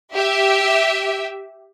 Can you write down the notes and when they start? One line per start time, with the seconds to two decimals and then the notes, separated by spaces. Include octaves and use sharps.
0.15 G4 E5